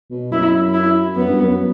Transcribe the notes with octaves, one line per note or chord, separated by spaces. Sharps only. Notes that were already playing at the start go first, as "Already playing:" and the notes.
B2
F#2 E4
E4
F#2 B3
G2
F#2